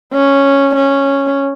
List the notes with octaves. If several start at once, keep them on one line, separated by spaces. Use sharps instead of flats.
C#4
C#4